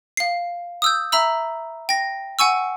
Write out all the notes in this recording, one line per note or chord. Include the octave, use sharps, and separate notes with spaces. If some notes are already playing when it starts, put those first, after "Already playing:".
F5 C7
D#6 E6 G6
E5 A#5 B5 E6
G5 A#6
F#5 G#5 C#6 E6